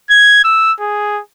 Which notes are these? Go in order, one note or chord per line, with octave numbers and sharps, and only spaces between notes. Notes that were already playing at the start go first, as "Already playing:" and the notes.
G#6
E6
G#4